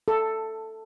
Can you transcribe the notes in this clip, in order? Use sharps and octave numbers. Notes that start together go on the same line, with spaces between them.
A4